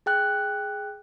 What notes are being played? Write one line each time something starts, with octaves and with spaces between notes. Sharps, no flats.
G#4 G5 F#6